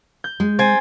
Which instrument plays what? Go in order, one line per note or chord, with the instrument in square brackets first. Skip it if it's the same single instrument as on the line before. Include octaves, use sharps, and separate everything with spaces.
[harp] G6
[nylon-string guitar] G#3
[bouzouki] C4 [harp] G#5 A6